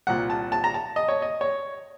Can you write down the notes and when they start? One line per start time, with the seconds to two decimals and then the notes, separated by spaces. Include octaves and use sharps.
0.07 C2 A#2 F#5
0.30 A5
0.52 A5
0.64 A#5
0.74 A5
0.96 D#5
1.08 C#5
1.22 D#5
1.41 C#5